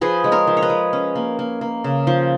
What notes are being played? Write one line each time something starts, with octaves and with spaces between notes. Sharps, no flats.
F3 G#4 B4
G#3
A#4 C#5
F3
C#5
B4 D#5
G#3
C#4
A#3
A#3
A#3
C#3
F3